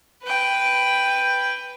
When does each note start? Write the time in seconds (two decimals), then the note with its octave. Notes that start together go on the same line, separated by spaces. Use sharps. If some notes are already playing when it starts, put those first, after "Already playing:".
0.24 B4 G5